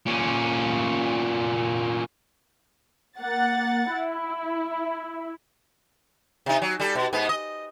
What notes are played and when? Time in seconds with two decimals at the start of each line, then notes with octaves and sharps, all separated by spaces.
0.06 A#2 C#4
3.20 A#3 F#5 A6
3.92 E4
6.46 C3 D#4
6.62 F#3
6.80 G3 A4
6.95 B2
7.13 G#2 B3
7.29 D#5